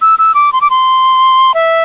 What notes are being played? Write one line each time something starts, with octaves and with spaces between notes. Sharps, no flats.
E6
E6
D6
C6
D6
C6
E5